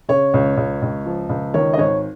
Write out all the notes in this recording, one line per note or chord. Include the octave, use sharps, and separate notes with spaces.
C#3 C#5
C#2
C#2
C#2
F3
C#2
D#3 C#5
D#5
G#1 C#5